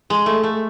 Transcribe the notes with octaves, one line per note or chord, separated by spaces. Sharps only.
G#3
A3
A3